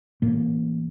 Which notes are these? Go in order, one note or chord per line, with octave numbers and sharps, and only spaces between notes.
A1 A2 A#3